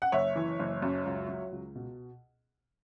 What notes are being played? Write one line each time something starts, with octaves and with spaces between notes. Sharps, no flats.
F#5
F#1 C#5 E5
E3
F#1
F#2
C#2
F#3
C#2
B2